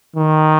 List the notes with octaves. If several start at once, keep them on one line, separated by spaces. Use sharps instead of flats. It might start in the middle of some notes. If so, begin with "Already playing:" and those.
D#3